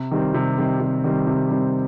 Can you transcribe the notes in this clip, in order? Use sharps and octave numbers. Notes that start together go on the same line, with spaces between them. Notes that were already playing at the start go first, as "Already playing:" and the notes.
Already playing: C3
D#3 G3 C4
C3
D#3 G3 C4
C3
D#3 G3 C4
C3
D#3 G3 C4